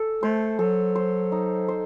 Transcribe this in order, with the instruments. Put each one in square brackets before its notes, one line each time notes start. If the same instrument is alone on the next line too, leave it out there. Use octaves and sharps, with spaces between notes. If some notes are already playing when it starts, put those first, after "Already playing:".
Already playing: [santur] A4
[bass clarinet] A3 [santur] C5
[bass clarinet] F#3 [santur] A4
[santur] C5
D#4
C5